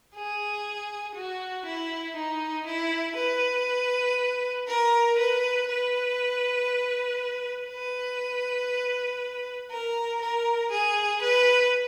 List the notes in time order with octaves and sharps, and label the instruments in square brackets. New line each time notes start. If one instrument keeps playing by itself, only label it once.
[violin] G#4
F#4
E4
D#4
E4
B4
A#4
B4
B4
B4
A#4
A#4
G#4
B4